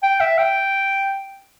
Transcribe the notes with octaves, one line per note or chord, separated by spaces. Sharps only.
G5
E5
G5